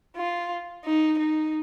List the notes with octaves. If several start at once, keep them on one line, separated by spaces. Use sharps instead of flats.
F4
D#4
D#4